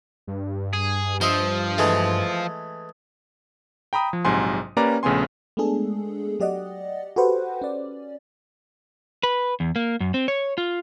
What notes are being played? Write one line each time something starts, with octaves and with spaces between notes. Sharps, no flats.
G2
G#4
F3 C5 D#5 E5
E3 G#3 A3
G5 A#5 B5 D#6
F3
A#1 G#2 C3 F#3 G#5 C6
A#3 C#4 G4 B4 D5 A#5
A#1 C#3 A3 B3 G#5 C6
G#3 A3 B3 D4 G#4 A4
F#3 G4 D5 D#5 F#5
F#4 G4 A4 B4 C5 F#5
C#4 D5
B4
E2
A#3
F#2
C4
C#5
F4